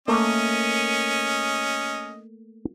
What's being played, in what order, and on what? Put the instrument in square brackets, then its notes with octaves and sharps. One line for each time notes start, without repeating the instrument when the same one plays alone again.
[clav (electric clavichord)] A3 A#3 A#4 [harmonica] C#4 D#5